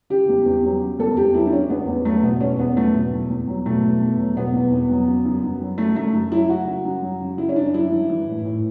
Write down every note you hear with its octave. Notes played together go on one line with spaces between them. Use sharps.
C#3 G4
E2
E2
F#3
C#3
E2 A4
E2 G4
F#3 E4
D4
C#3 C#4
E2 B3
E2
F#3 A3
B2 B3
E2 C#4
E2 B3
F#3 A3
B2
E2
E2
F#3
B2 A3
E2
E2
F#3
B2 B3
E2
E2
F#3
C#3
F#2
F#2
F#3
C#3 A3
F#2 A3
F#2
F#3 E4
C#3 F#4
F#2
F#2
F#3
C#3
F#2 E4
C#4
F#2 D4
F#3 E4
E3
E3
A2
A2